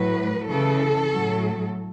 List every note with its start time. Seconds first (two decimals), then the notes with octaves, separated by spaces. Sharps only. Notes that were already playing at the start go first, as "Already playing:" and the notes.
Already playing: A2 F#3 B4
0.49 C#3 E3 A4
1.13 A2 F#3